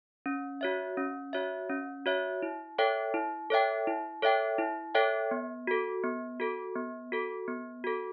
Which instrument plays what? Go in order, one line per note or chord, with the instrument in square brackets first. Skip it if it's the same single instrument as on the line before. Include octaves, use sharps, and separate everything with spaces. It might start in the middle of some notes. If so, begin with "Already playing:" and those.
[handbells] C#4
F#4 C#5 E5
C#4
F#4 C#5 E5
C#4
F#4 C#5 E5
E4
A4 C#5 E5 G5
E4
A4 C#5 E5 G5
E4
A4 C#5 E5 G5
E4
A4 C#5 E5 G5
B3
F#4 A4
B3
F#4 A4
B3
F#4 A4
B3
F#4 A4